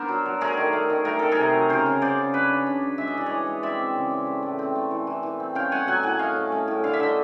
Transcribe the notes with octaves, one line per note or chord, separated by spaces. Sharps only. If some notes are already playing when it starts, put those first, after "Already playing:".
Already playing: B3 D4 A#4 C5
F#3
F#3
A3 G#4 A#4
D#3
A3
D#3
A3 A#4
D#3 A4
G#4 A#4
C3
F#3
C#3 A#4 C5
C#3
C#3 C5 D5
C#3
D4 B4 C#5
D4
D4
C#3
G#3 E5
D#5
E3 D5
E3 C#5 D#5
G#3
C4 D5 E5
C4
C#3
C4
A3
A2
C4
A3
E3
E3
E3
C4
C#4 F5 G5
A3 F#5 G#5
F#3 F#5 G#5
A2 F#5 G#5
A3 D#5 F5
C#4
A3
A2
D3 F5
E5
D3 D#5